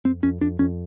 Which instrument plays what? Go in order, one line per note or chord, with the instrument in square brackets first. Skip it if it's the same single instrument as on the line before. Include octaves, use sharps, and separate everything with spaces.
[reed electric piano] F2 [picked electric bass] C4
[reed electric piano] F2 [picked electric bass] C#4
[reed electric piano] F2 [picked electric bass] D4
[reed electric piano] F2 [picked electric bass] C#4